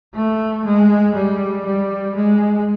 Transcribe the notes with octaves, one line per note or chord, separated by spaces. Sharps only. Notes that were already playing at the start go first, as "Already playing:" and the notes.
A3
G#3
G3
G3
G#3